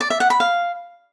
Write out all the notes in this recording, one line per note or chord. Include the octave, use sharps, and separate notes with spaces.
D5
E5
F#5
B5
F5